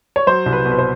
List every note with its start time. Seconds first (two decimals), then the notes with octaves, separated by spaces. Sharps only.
0.16 C#5
0.27 F#3 C5
0.46 C2
0.52 B4
0.65 B2
0.72 B4
0.79 C5